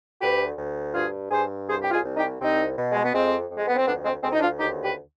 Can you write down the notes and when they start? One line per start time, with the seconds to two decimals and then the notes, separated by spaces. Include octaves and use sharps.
0.21 D2 G4 B4
0.58 D2
0.94 G2 F4 G#4
1.30 G2 G#4 C5
1.67 C2 G#4 C5
1.81 G4
1.91 F4 G#4
2.04 C2
2.15 D#4 G4
2.40 C2 C4 D#4
2.77 B2
2.92 G#3
3.03 B3
3.13 F2 G#3 C4
3.49 F2
3.56 G#3
3.66 B3
3.76 C4
3.86 D2 B3 D4
4.04 G#3 C4
4.22 D2 G#3 C4
4.32 D#4
4.40 D4 F4
4.59 D#2 D#4 G4
4.83 G4 B4